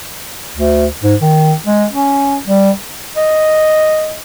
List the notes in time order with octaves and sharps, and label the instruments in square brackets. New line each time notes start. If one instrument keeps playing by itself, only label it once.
[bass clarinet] D2
G#2
D#3
G#3
C#4
G3
[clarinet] D#5